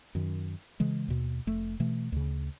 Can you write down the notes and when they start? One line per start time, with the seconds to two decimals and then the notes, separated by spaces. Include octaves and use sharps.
0.15 F#2 D#3
0.80 C#3 E3 G#3
1.08 D#2 B2
1.47 F1 A3
1.80 B2 E3 A3
2.12 D2 C#3